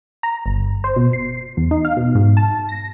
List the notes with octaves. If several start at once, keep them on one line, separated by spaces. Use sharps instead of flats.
A#5
G1
C5
B2
C7
E2
D#4
F5
B2
G#2
A5
A#6